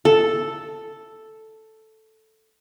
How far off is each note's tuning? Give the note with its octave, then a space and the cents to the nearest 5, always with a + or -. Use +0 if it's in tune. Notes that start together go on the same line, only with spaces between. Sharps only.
A4 +0